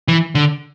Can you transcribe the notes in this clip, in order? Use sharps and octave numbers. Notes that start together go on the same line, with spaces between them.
E3
D3